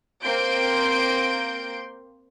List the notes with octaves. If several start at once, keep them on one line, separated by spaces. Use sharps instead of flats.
A#3 C4 C6 G6 D7